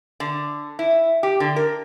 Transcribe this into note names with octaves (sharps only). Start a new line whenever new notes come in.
D3
E4
G4
D3
A#4